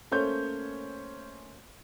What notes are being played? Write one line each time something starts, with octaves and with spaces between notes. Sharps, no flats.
A3 A#3 C#4 C5 C#5 G6